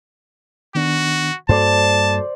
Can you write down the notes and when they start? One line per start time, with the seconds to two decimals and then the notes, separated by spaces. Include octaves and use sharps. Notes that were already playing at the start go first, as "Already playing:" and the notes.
0.75 D#3 B3 D4 F#4
1.49 G2 A#3 F#4 A4 C5 D5 A5